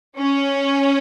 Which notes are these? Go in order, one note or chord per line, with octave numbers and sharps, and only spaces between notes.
C#4